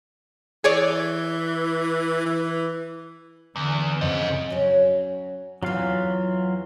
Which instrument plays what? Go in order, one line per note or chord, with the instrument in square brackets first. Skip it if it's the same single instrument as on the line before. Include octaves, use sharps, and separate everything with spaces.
[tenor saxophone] E3 [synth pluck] G#4 C#5 D5
[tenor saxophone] E3
[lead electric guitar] E2 [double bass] D3
[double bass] F2 C#3 [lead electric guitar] C5 D#5
[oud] F#3 C#4
[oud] E2 E3 [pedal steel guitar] F#3 F4 F5